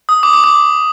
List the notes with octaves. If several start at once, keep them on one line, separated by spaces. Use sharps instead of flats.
D#6
D6
D6
D6